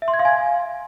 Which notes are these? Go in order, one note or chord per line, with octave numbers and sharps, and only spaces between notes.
E5
C6
G#6
F5
G#5